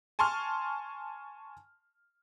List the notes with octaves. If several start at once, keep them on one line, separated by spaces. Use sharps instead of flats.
G#5 A5 C6 C#6 F6